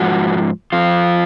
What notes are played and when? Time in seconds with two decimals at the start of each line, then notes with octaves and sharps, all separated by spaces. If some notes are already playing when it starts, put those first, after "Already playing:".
Already playing: G#2 F3 F#4
0.72 F2 F3 F4